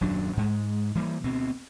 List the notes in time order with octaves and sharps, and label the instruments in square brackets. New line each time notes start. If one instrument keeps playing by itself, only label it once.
[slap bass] D#1 F#2 F#3 D4
G#2 G#3
E3 G3 A#3
D2 B2 C4